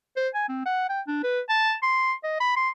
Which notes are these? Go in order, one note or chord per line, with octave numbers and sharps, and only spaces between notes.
C5
G#5
C4
F#5
G5
D4
B4
A5
C6
D#5
B5
C6